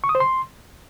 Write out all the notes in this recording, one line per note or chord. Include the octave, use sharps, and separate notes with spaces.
C#6
D#6
C5
C6